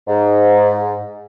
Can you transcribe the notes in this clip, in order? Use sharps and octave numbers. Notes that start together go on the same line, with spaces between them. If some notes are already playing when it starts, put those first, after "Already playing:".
G#2